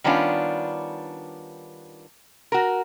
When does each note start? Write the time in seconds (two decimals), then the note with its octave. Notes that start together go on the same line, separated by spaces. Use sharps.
0.04 D#3 G3 B3 C#4 D4 F4
2.52 F#4 A#4